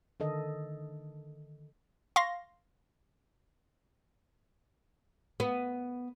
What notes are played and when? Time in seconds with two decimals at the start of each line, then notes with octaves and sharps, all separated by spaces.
0.20 D3 D#3 A4 D#5
2.16 F5 C6 C#6 A#6
5.40 B3